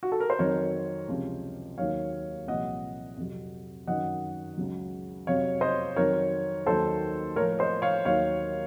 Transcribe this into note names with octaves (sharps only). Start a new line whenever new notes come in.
F#4
A4
A#4
C5
F2 D#3 F#3 A#4 C#5
C#2 C3 F3
D#2 D#3 F#3 C#5 F5
C2 A#2 F3 D#5 F#5
F2 C3 F#3
F#2 D#3 F#3 D#5 F#5
C#2 C#3 F#3
F2 C3 F#3 C#5 F5
C5 D#5
F2 D#3 F#3 A#4 C#5
D#2 D#3 F#3 A4 C5
A2 F3 A#4 C#5
C5 D#5
C#5 F5
D#2 D#3 F#3 C#5 F5